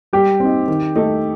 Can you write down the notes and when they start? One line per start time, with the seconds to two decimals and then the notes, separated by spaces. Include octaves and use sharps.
0.13 G3 G4
0.40 C4 D#4
0.68 D#3
0.96 A3 D#4